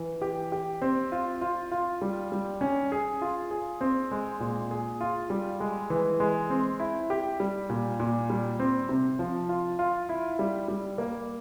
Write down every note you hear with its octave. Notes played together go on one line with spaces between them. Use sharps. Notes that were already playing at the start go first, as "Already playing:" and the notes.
Already playing: E3
G4
G4
C4
F4
F4
F4
G3
G3
C#4
G#4
F4
G#4
C4
G#3
A#2
G#4
F4
G3
G#3
E3
G#3
C4
E4
G4
G3
A#2
A#2
G3
C4
C3
F3
F4
F4
E4
G3
G3
A#3